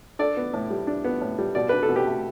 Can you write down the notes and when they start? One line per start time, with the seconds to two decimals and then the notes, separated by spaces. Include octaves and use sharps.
0.19 D4 A4 D5
0.37 B3
0.53 A2
0.70 G3
0.87 D4
1.04 B3
1.21 A2
1.39 G3
1.55 B2 D5
1.69 D4 B4
1.83 A4
1.89 B2
1.96 G4 B4
2.07 A3